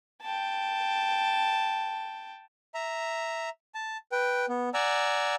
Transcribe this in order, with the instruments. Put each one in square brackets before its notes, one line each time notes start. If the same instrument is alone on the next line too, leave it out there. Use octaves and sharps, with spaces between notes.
[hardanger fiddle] G5 A5
[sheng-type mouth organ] E5 A#5
A5
B4 G5
B3
D5 F#5 G#5 A#5 E6